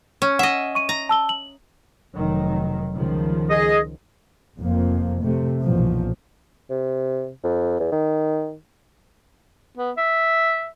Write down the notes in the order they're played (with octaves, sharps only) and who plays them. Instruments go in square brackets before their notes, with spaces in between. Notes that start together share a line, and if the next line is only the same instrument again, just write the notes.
[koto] C#4
[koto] D#5 E5 [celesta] F#5
[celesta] C#6 D#7
[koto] A#5
[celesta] A5 E6 G7
F#7
[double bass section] F1 D#3 F#3
C#2 D#3 F3
[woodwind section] G#4 D#5
[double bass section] F1 F2 F3 A#3
C3 A3
B1 F#2 A#2 E3 F3
[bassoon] C3
F2
E2
D#3
[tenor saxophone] B3
E5